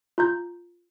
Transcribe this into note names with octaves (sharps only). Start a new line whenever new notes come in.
F4 A#5 G6